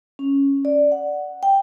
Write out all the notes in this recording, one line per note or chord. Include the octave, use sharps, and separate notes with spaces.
C#4
D5
F#5
G5